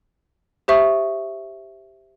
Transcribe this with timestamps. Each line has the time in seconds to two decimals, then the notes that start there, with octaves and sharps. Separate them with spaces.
0.68 G4 C5 E5 C#6 D#6